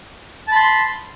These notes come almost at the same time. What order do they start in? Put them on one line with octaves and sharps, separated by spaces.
A5 B5 C6